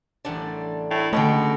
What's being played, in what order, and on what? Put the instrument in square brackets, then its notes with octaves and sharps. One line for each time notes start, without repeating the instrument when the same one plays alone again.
[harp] A1 F#5 A5 [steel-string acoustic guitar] G3 A3 D4
[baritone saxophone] A2
[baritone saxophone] B2 [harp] D3 G#3 C#4 [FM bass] A3 [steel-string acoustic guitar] D#5 F#5 G5